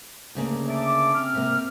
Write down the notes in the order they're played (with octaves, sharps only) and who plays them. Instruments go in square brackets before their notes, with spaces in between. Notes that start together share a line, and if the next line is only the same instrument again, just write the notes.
[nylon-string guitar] D2 C#3 A#3
[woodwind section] E5 A5 D6
C4 F6
[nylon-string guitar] C3 A#3